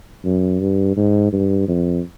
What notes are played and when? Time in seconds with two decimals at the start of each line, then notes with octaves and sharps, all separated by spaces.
0.25 F#2
0.60 G2
0.97 G#2
1.33 G2
1.68 F2